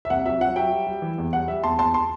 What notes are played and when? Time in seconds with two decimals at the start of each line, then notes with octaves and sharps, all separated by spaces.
0.05 E5
0.10 C2 F#5
0.26 F#3 E5
0.41 F#3 F#5
0.56 F#3 E5 G5
0.72 G3
0.87 G3
1.02 E3
1.18 E2
1.33 G3 F#5
1.48 G3 E5
1.64 E2 A5 C6
1.79 E2 A5 C6
1.94 A5 C6